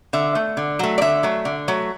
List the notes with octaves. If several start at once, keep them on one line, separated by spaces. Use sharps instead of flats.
D3 E5
A3
D3
F#3 A3
D5
D3 E5
F#3 A3
D3
F#3 A3